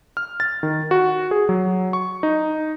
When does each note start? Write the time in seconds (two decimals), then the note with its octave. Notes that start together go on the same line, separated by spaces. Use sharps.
0.17 F6
0.40 A6
0.63 D#3
0.91 F#4
1.31 G#4
1.49 F#3
1.93 C#6
2.23 D#4